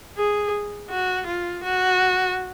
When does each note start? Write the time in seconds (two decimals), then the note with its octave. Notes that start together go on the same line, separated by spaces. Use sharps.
0.17 G#4
0.90 F#4
1.27 F4
1.64 F#4